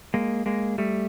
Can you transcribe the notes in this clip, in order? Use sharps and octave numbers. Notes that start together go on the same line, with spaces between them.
G#3 A#3
G#3 A#3
G3 A3